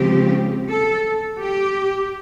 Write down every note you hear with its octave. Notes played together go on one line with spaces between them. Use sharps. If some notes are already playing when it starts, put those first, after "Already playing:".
Already playing: C#3 F3 G#3 C4 G4
A4
G4